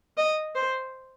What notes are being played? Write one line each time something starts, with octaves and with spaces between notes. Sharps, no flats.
D#5
C5